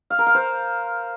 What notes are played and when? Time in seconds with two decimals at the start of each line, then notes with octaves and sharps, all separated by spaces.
0.10 F5
0.18 A#4
0.27 F5
0.35 C5